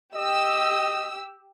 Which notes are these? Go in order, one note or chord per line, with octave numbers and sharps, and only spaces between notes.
G4 D#5 E6